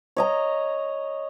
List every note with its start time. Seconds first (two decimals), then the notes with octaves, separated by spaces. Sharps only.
0.17 C#5 D#5 A#5